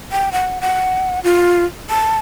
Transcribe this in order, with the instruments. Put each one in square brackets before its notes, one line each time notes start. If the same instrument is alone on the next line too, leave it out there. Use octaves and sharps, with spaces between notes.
[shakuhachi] G5
F#5
F#5
F4
A5